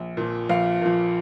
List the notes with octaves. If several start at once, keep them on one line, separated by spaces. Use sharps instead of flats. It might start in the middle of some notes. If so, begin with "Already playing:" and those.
Already playing: A#1
A#2 F3
A#1 F5
A#2 F3